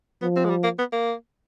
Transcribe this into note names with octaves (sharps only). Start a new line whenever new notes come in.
F3 B3
C4
G#3
G3
A#3
B3
A#3